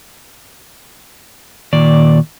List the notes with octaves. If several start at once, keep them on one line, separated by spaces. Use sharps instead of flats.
A#2 D#3 D5